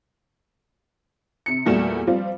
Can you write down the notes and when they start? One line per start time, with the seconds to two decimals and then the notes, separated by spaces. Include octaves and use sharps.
1.46 C3 C#7
1.66 E2 A#2 G3 A3 F#4 E7
2.07 F3 G3 C4 F4